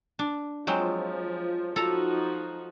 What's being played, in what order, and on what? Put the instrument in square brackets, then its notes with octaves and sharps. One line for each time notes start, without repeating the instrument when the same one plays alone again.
[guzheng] D4
[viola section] F3 [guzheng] F#3 G#3 C4
[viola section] F3 D#4 F#4 [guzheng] A4 A#5